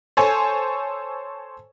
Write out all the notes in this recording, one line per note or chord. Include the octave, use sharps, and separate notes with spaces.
A4 C5 C#5 G#5